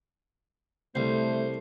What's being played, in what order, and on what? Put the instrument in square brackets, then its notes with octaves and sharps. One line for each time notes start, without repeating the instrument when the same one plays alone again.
[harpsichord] C2 [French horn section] A3 [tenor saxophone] C5